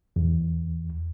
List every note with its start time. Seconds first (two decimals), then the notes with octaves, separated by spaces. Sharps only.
0.16 E2